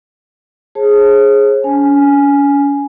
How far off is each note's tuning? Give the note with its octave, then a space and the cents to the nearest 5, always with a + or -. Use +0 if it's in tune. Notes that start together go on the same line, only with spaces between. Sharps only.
G#4 +0 C#5 -45 A5 +0
C#4 +40 G#5 +0